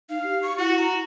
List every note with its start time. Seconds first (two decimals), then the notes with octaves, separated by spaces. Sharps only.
0.10 D#4 F5
0.23 G4
0.43 C#6
0.58 E4 F#4 F#5
0.78 A#5